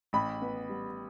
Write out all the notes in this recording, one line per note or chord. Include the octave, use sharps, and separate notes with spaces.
A1 B5
B3
G3